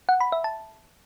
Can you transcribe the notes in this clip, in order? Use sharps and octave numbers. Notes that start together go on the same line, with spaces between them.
F#5
B5
E5
A5